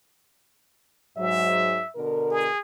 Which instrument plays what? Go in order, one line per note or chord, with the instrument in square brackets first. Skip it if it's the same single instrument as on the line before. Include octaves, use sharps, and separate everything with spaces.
[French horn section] G#2 F#3 [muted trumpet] E5
[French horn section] B2 D3 A#4
[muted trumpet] G#4